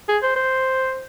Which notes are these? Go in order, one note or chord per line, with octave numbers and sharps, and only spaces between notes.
G#4
C5
C5